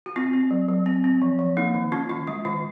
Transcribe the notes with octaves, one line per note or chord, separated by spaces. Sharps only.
F#4
C4 F4
C4
F#3
F#3
C4
C4
F3
F3
A#3 D#4
D#3
C#4 F4
D#3 F4
G#3 F4
D#3 F4